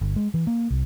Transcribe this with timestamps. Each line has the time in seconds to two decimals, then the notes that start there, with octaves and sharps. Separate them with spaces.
0.01 G1
0.16 G#3
0.34 E3
0.47 A#3
0.70 C2